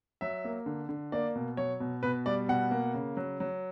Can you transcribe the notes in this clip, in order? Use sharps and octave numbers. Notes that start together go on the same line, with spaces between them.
F#3 E5
A#3
D3
D3
A#3 D5
B2
F#3 C#5
B2
B2 B4
G3 D5
B2 F#5
A#3
C#3
F#3
F#3